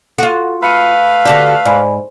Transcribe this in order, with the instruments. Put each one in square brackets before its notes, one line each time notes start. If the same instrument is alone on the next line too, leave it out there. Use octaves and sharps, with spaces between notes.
[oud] F4 F#4 [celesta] A4
[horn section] A3 B4 F5 [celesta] B5 C#7 D#7
[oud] D3 F#4 G4 [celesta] D5 A5 B6
[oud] G#2 [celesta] D5 G#5 B5